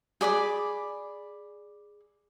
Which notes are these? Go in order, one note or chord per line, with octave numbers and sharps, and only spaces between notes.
G#4 D5 B5 D6